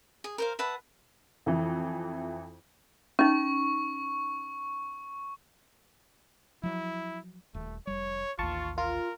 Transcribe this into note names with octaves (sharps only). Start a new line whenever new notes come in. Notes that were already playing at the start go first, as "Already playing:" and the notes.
G#4
A#4 C5 F5
B4 E5 F#5 A5
F2 E3
C#4 D#4 C#6
F3 F#3 E4
D#1 A3
F1 G3 C#5
A1 D#2 F4 A5 C#6
F4 A#4